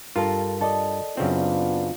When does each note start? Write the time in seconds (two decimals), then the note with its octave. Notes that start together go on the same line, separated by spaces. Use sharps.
0.16 G2 F4 A4 A#4 F5
0.61 A4 D5 D#5
1.17 F#2 C#3 B3 C4 D4 F4